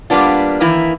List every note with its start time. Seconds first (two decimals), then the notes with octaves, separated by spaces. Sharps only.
0.10 G3 A#3 B3 D4 F4
0.60 D#3 E3 A#3 E4